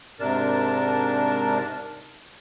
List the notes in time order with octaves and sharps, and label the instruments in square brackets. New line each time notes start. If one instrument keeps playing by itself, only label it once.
[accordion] G#2 C3 D4 A#4 A5